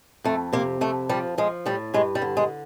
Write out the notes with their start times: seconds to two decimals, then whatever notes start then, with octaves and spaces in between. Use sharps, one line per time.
0.24 F2 A3
0.53 C3 A#3
0.81 F2 A3
1.09 F3 G3
1.38 F3 G#3
1.66 A2 G3
1.94 G2 G#3
2.15 G3
2.22 D3
2.37 G#3